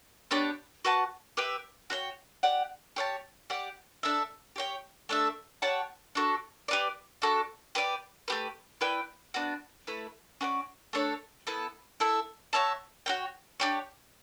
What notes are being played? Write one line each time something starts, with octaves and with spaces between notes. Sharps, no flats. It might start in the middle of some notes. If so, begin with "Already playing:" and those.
B3 D4 G4 C#5
F#4 B4 F#5 A5
G4 B4 E5 G5
F#4 C#5 G5
G4 D5 F#5
G4 C#5 F#5 A5
G4 D5 F#5
D4 A4 E5
G4 C#5 G5
A3 D4 A4 E5
G4 C#5 F#5 A5
D4 F#4 A4
G4 B4 D5
D4 F#4 A4
G4 B4 D5
A3 C#4 G4 B4
E4 B4 D5 G5
B3 D4 F#4
A3 E4 B4
C#4 F#4 B4 D5
A3 D4 A4 C#5
B3 E4 A4
E4 A4 E5
F#4 C#5 E5 A5
F#4 C#5 G5
D4 G4 C#5